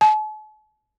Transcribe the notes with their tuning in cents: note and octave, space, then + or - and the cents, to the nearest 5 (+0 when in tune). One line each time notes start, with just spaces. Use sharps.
A5 -45